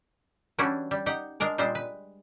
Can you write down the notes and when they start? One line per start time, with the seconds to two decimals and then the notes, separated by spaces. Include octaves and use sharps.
0.59 E3 G3 C#4 D4 E4 F#4
0.91 G3
1.06 D#4 G4 F#5
1.40 G#3 D4 A#4 D5
1.58 A#2 G3 G#3 C5
1.75 B4